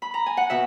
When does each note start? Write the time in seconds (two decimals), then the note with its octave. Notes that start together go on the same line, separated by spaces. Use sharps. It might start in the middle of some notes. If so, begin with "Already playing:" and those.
0.02 B5
0.14 A#5
0.26 G#5
0.37 F#5
0.50 B2 E5